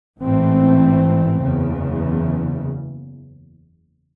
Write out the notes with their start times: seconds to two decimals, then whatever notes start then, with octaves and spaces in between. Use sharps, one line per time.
0.20 A1 G#2 E3 A3 C4
1.42 F#1 E2 C#3